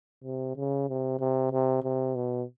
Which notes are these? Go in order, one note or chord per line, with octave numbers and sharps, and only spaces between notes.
C3
C#3
C3
C3
C3
C3
B2